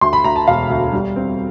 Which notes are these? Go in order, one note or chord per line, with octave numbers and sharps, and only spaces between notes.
D2 C6
B5
D2 A#5
A5
E1 F5
D2
G3
C4